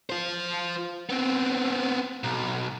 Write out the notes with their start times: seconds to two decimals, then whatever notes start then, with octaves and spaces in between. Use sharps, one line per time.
0.10 F4 C5
1.10 B3 C4
2.24 B1